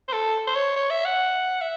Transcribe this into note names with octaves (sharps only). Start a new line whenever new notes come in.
C5
A4
C5
C#5
C#5
E5
F#5
E5